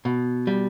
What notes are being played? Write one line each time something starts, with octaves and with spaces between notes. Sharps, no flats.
B2
G3